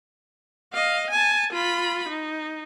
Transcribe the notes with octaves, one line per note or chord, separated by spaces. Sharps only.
D#5 F5
G#5 A5
F4 B5
D#4